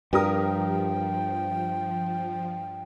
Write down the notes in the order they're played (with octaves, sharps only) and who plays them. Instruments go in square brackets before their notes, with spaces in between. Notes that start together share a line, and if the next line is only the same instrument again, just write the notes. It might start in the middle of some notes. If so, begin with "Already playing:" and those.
[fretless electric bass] G2 [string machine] F3 [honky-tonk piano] G4 A#4 D#6 [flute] G5